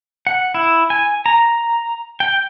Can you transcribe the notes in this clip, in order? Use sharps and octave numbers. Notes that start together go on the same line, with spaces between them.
F#5
E4
G#5
A#5
G5